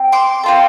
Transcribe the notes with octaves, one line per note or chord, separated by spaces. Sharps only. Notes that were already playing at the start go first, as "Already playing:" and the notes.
Already playing: C4
C6 D6
C4 F4 A4